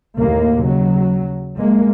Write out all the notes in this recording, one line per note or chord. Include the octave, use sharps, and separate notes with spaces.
D#2 A2 A#3
C#3 F#3
G#3 A#3